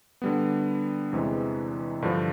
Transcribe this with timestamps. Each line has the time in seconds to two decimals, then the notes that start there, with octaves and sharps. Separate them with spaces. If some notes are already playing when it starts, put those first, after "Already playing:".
0.22 D3 G3 B3
1.13 E2 C3 E3 G#3
2.02 G2 D3 F3